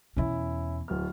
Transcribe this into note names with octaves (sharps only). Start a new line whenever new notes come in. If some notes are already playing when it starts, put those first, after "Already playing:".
E2 B2 C#4 E4
D1 F6